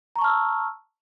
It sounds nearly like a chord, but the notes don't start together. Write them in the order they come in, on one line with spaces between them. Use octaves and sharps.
A#5 C#6 A5 F6 E6